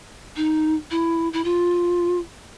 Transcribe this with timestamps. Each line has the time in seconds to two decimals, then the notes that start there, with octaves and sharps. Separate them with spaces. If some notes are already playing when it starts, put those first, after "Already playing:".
0.37 D#4
0.91 E4
1.33 E4
1.44 F4